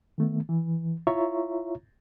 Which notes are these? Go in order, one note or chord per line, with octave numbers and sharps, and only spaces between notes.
D#3 A3 B3
E3
E4 F4 C#5 E5 A#5 C#6